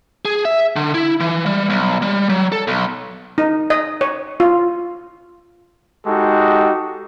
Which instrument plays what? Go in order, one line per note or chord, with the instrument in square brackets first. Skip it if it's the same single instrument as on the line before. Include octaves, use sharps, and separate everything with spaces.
[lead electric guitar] G#4
E5
D3
E4
E3
G3
B1
G3
F#3
A4
B1
[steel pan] D#4
D#5
C#5
F4
[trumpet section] G#3 D#4 F#4 G4 A4